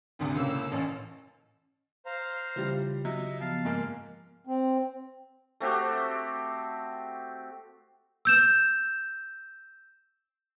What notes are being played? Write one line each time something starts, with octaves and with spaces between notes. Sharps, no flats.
G#1 D2 C3
C#2 A2 A#3 E6
A1 C#4 A5
C5 F5 A#5
C#3 E3 G3 F4 G4
F#3 D#4 E5
F3 B3 F5 A5
G#2 A#3 G#5 F6
C4
A3 C4 F#4 G4
E6 G6 E7